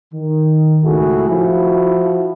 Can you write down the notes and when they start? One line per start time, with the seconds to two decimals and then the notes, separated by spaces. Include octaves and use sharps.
0.13 D#3
0.85 C#2 A2 E4 F#4 G#4 A4
1.29 F3 E4 F#4